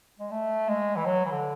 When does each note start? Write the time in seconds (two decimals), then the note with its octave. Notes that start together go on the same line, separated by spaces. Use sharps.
0.19 G#3
0.31 A3
0.69 G#3
0.96 E3
1.06 F#3
1.25 E3
1.31 D3